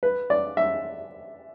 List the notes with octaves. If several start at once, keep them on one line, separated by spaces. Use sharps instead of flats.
B4
D5
E5